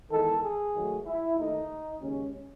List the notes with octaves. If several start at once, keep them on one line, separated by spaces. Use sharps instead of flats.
E2 D#3 G#3 A4
G#4
G#2 D#3 F#3 A3
E4
D#2 D#3 A3 D#4
D#2 C#3 G#3 C#4